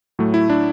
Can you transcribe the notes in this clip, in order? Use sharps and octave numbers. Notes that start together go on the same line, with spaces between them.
A2 F#3 A3
E4
D4